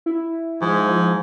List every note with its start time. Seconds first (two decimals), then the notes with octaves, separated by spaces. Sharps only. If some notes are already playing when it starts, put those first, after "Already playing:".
0.06 E4
0.62 G#2 F3